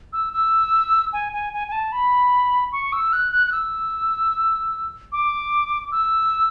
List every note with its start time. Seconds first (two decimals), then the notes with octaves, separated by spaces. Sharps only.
0.13 E6
0.33 E6
1.13 G#5
1.33 G#5
1.53 G#5
1.68 G#5
1.72 A5
1.92 B5
2.72 C#6
2.93 E6
3.13 F#6
3.32 F#6
3.47 F#6
3.52 E6
5.12 D6
5.92 E6